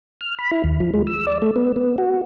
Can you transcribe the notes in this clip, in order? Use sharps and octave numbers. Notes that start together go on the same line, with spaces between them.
F6
B5
E4
D#2
F3
G#3
E6
D5
A3
B3
B3
F#4